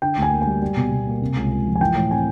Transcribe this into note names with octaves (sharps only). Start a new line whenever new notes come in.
D3 G5
D2
G#5
A#3
G#5
G3
G3
B2
B2
A#3
C3
C#2
C#2
F3
G#5
E3 G5
A2
C4 G#5